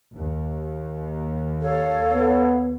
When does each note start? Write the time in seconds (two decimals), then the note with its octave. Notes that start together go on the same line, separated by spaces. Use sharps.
0.15 D#2
1.62 A4 C#5 F5
2.13 B3